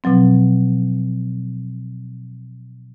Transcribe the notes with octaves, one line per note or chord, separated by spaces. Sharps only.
B2 F3 F#3 C4